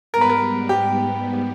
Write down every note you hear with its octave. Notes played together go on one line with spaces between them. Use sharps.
G#2 G3 B3 A#4
B4
A#4
G4